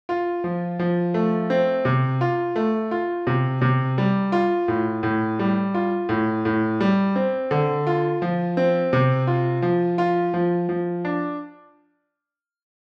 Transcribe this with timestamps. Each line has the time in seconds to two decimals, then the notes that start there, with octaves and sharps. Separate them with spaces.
0.09 F4
0.44 F3
0.79 F3
1.14 A3
1.50 C4
1.85 C3
2.21 F4
2.56 A3
2.91 F4
3.27 C3
3.61 C3
3.98 G3
4.32 F4
4.68 A2
5.03 A2
5.39 G3
5.74 F4
6.09 A2
6.45 A2
6.81 G3
7.16 C4
7.51 D3
7.87 F4
8.22 F3
8.57 C4
8.93 C3
9.27 F4
9.62 F3
9.98 F4
10.34 F3
10.69 F3
11.05 D4